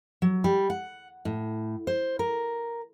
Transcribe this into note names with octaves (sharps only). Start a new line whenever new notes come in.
F#3
G3
F#5
A2
C5
A#4